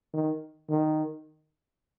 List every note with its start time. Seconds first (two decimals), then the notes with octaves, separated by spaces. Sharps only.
0.14 D#3
0.70 D#3